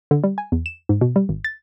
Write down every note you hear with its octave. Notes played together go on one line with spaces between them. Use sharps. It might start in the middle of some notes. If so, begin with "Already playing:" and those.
D3
G3
G#5
E2
E7
G#2
B2
G3
G#1
A6